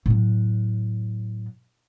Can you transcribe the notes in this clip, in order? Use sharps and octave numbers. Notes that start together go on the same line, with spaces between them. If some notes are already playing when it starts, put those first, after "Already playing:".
A2 F#3